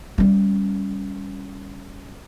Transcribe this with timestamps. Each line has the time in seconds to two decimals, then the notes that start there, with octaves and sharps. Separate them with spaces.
0.18 G3 C#4